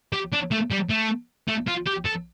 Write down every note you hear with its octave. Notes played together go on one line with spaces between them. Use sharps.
G4
D4
A3
G3
A3
A3
F4
G4
A4